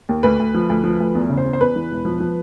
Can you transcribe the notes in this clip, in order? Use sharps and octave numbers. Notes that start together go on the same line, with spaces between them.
D#2
D2 B4
D2
F3
D2
F3
D2
E2
C#3
C5
E2
C5
E2 B4
E3
E1
F3
F3